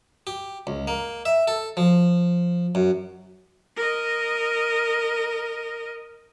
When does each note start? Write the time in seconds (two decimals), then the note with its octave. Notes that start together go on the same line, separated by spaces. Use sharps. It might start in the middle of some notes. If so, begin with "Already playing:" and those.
0.27 G4
0.67 C#2
0.87 A#3
1.25 E5
1.48 A4
1.77 F3
2.75 F#2
3.76 A#4 D#5